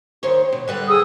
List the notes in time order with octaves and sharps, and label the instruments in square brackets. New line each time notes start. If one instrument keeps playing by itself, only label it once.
[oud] D#2 C5 C#5
B2
[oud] D3 G3 B4 [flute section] F#6
[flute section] G#4 D#6 E6